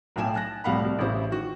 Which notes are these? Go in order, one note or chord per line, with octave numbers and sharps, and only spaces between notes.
B1 A2 G5 G#5 E7
G#5 A5 F#6 A#6
C2 A2 F5 F#5 B5
C2
A1 C#3 E4 C5
D#3 F#4